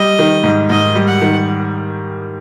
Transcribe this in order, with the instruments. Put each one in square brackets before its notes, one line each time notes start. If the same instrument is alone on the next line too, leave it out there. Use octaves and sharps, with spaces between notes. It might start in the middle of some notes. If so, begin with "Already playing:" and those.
Already playing: [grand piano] G3 [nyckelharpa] D#5
[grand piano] D#3
G#2
[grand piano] G#2 [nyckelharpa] D#5
[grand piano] G3
[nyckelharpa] F#5
[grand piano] D#3